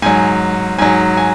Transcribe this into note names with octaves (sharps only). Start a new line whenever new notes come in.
G#2 F#3 G#5
G#2 F#3 G#5
G#5